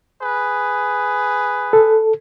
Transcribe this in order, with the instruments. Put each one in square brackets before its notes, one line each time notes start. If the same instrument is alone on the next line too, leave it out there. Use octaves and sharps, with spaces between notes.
[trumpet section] G#4 B4
[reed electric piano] A4